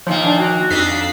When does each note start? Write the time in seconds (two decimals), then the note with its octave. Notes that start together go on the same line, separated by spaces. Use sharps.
0.07 A#2 D#3 F3 A#3 C#5 C6
0.25 D4 D5 F#5 A5
0.38 F#4 G5
0.70 F2 D4 D#4 A4 B6 C7
0.90 F5